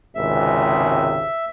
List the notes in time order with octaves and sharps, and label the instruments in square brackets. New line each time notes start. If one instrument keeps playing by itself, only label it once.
[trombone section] G#1 C#2 C3 [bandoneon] E5